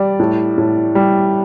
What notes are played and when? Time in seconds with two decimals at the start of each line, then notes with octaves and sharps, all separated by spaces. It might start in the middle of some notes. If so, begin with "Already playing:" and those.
Already playing: G3 D5
0.20 A2
0.58 A2
0.95 G3